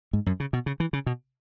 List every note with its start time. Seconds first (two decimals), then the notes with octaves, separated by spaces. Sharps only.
0.13 G#2
0.26 F#2
0.40 C#3
0.53 B2
0.66 C#3
0.80 E3
0.93 C#3
1.06 B2